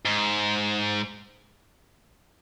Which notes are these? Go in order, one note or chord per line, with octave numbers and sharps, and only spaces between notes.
G#2